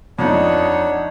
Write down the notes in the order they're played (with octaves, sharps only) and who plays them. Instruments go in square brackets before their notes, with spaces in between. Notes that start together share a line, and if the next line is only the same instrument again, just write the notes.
[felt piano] F2 [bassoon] D4 [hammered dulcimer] D#4 D#5 [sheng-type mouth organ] C#5 F#5